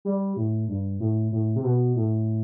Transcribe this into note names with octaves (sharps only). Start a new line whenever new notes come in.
G3
A2
G2
A2
A2
C3
B2
A2